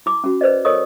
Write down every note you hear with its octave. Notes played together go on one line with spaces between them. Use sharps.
E4 D6
C#4 F#4
B4 C5 D5 D#5
A4 A#4 C#5 D#5 C#6 D#6